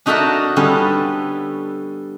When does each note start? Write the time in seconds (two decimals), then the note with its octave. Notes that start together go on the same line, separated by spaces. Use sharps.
0.06 D4 D#4 F#4 A4 A#4 E5
0.56 D3 G3 B3 C#4 A4